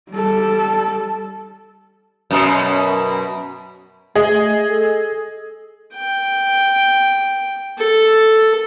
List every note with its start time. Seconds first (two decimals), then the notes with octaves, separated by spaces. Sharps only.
0.11 G3 A4
2.31 F#2 B2
4.15 A3 G#4 D#5
4.69 A4
5.95 G5
7.78 A4